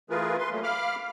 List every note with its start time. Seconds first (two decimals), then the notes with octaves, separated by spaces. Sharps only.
0.10 E3 A3 F4 G#4 A#4 B4
0.39 B4 C6
0.51 F#3 A3 A#3
0.63 F5 B5 D6 F6